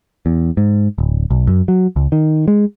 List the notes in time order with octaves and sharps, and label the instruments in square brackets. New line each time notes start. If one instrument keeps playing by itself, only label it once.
[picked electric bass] E2
G#2
D1
B1
F#2
F#3
C#2
D#3
G#3